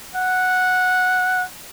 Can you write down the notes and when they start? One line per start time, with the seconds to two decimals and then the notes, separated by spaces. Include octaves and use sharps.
0.15 F#5